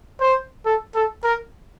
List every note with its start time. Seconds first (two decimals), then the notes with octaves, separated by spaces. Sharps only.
0.20 C5
0.66 A4
0.95 A4
1.24 A#4